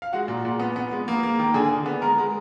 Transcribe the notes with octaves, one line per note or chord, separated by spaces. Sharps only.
F5
G#3 F#4 F#5
A#2
A#2
B3
B3
G#3
A#3
A#3
D#3
D3 G#4 G#5
D3
B3
G#3 A#4 A#5
G#3